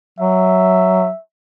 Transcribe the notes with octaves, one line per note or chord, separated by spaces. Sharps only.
F#3 E5